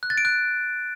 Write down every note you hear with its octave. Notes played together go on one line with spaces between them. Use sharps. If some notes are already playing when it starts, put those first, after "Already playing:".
F#6
A6
D7
F#6